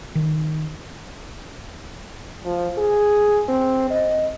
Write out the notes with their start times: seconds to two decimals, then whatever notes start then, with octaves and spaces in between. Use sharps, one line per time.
0.15 D#3
2.45 F3
2.78 G#4
3.49 C4
3.91 D#5